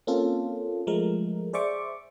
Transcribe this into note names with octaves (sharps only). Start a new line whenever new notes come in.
A#3 C4 C#4 F4 A4
F3 G#3 A3 A#4
G#4 C5 D5 E5 C#6 D6